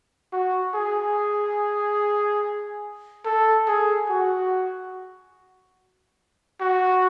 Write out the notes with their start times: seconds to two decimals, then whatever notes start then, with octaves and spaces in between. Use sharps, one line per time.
0.33 F#4
0.75 G#4
3.25 A4
3.68 G#4
4.10 F#4
6.61 F#4